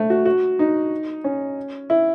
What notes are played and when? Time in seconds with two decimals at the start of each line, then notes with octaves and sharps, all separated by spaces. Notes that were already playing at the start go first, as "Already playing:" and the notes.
Already playing: A3
0.10 F#4
0.25 F#4
0.59 D#4
1.24 C#4
1.90 E4